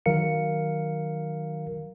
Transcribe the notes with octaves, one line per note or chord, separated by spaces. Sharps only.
D#3 F#3 A#4 F5 C#7